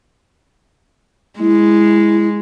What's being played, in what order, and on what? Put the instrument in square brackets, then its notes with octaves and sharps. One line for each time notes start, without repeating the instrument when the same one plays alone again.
[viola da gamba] G#3 [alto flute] E4